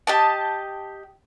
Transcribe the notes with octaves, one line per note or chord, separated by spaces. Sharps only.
G4 D#5 A5